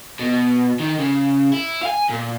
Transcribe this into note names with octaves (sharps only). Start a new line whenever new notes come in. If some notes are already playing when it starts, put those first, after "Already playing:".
B2
D#3
C#3
E4
F5 G#5
A#2